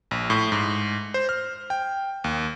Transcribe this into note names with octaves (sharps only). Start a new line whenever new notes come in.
A#1
A2
G#2
C5
F6
G5
D#2